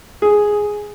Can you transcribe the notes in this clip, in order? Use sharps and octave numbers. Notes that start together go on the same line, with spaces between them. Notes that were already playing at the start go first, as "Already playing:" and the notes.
G#4